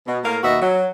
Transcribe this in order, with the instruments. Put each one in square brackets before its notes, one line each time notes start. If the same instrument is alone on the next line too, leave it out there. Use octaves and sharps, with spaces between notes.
[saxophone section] B2
A2 A#3 A#4 F5
D#2 B2 B3 F#4 D#5 E5
F#3